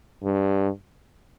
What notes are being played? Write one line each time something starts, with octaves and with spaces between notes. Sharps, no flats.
G2